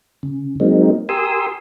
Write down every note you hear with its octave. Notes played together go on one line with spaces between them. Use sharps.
C#3
F#3 G#3 A#3 C4 D#4
G4 A#4 G#5 C6 D#6 E6